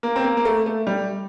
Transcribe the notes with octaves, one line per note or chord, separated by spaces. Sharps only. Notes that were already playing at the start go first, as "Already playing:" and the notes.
A#3
C4
A#3
A#3
A3
A3
G3